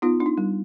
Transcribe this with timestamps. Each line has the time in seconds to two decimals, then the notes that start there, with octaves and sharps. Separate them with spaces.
0.02 B3 D#4 F4
0.20 D4
0.26 D#4
0.38 G3